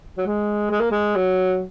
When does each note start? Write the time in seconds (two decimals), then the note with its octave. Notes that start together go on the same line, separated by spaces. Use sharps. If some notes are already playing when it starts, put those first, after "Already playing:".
0.17 F#3
0.26 G#3
0.71 G#3
0.80 A#3
0.91 G#3
1.15 F#3